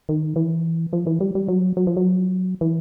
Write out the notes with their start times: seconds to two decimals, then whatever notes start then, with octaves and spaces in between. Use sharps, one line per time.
0.09 D#3
0.36 E3
0.93 F3
1.06 E3
1.20 G3
1.35 G3
1.48 F#3
1.77 F#3
1.87 F3
1.97 F#3
2.61 E3